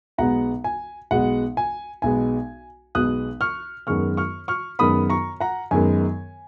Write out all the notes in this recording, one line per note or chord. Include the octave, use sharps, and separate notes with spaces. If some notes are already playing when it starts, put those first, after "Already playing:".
B1 B2 G#3 B3 F#5 A#5
G#5
B1 B2 G#3 B3 F#5
G#5
B1 B2 G#3 B3 G#5
B1 B2 G#3 B3 D#6 F#6
C#6 F6
F#2 D#3 G#3 B3 C#6 F6
C#6 F6
C#6 F6
F#2 D#3 G#3 B3 B5 D#6
A#5 C#6
F#5 A#5
F#2 D#3 G#3 B3 G#5